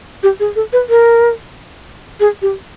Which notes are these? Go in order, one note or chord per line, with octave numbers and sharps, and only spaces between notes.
G4
G#4
A4
B4
A#4
G#4
G4